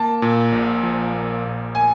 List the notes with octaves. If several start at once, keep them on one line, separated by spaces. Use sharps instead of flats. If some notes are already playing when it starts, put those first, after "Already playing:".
Already playing: A#3 A5
A#2
A#1
F3
A#3
A#2
G#5